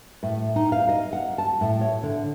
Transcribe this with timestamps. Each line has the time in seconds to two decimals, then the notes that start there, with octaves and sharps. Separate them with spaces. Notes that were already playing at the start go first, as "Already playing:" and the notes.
0.23 A2
0.56 D#4
0.72 F5
0.89 D#5
1.13 F#5
1.38 A5
1.61 A2
1.81 C#5
2.03 D3